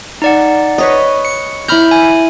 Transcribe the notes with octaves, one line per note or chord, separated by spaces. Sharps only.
D#4 D5 F#5
B4 C#5 D#5
C#7
E4 A#5 B5 F6 G6
G#5